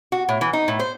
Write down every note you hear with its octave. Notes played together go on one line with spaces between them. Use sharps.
F#4
A2
E3
D#4
A2
C5